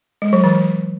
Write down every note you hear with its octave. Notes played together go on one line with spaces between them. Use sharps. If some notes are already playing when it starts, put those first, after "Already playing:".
G#3
F#3
E3